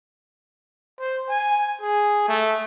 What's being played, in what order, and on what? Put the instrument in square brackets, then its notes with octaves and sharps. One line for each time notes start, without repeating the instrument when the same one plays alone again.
[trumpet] C5
G#5
G#4
A3